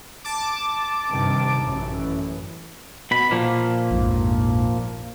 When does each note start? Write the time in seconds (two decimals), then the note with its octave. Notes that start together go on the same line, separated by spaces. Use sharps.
0.25 A5 D6
1.10 G2 C3 D#3
1.63 A1 F#2 E3
3.11 B2 B5
3.31 A#2 F3 A#3
3.91 A#1 F2 G#2